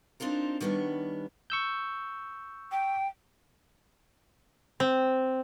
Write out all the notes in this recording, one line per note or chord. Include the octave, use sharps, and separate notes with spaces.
C4 D4 D#4 F4 A#4
D#3 G3 B3 C#4 D4
C#6 E6 G6
G5
C4